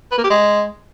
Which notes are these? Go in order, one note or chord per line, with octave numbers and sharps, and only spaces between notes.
B4
A#3
G4
G#3